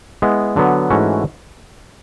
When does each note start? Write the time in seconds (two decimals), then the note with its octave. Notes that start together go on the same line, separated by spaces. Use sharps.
0.22 G#3 B3 E4
0.56 D3 F#3 B3
0.90 G#2 E3 A3 C#4 F#4